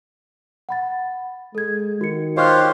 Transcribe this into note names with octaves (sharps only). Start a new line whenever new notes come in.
F#5 B5 A6
G#3 A4 G#6
D#3 F#4 C#7
F4 G4 C5 C#5 D#5 F6 F#6